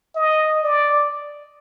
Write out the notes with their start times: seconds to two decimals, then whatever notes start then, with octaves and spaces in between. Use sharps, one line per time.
0.16 D#5
0.64 D5